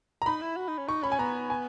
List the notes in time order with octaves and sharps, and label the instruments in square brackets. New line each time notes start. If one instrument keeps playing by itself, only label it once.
[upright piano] A#5
[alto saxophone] D#4 [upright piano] B5
[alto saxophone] E4
F#4
D#4
C#4
[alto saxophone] D#4 [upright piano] C#6
[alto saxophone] C#4 [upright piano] B5
[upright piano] G#5
[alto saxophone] B3 [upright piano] A#5
[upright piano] G#5